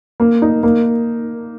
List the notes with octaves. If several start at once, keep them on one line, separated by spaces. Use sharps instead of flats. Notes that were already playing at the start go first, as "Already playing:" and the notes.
A#3
D#4
A#3